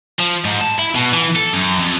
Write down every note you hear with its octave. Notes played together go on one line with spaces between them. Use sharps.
F3
G#2
A5
E4
B2
E3
A4
F#2
F2